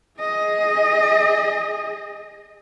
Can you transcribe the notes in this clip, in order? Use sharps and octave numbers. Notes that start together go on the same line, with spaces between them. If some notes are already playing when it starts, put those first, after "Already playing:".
G#4 D#5